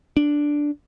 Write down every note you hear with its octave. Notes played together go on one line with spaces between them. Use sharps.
D4